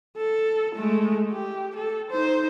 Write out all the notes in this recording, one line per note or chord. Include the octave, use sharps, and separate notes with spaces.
A4
G#3 A3
G4
A4
D#4 C5